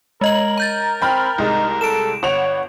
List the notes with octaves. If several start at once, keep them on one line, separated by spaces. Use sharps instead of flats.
G#3 A#4 D#5 F#7
A#5 G6 A6
C4 G5 B5 F6
C2 G#3 D#4
A4 D7 E7
G1 C#5 F#5 F7